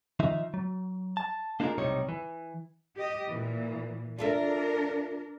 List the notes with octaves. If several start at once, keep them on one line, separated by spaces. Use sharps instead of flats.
D#3 F3 D#4 E5
F#3
A5
A#3 D4 D#4 F4 G#4 A#4
B1 A2 C3 G3 D#4 C#5
E3
G4 D#5
A#2 E3
D4 F4 A4 A#4 E5